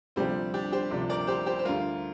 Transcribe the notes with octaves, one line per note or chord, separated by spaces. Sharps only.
D2 C3 F3 G3 C4 D4 G4
D4 G4
G4 C5
D2 C3 F3 D4 G4
A#4 D5
G4 C5
G4 C5
C5
D2 D3 G3 F4 A#4